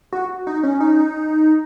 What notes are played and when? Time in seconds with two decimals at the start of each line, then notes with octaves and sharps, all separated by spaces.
0.12 F#4
0.47 D#4
0.63 C#4
0.80 D#4